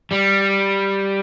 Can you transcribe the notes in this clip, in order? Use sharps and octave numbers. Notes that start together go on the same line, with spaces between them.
G3